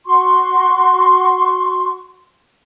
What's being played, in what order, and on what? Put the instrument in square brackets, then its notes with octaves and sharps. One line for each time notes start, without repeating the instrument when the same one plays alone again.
[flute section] F#4 C6 C#6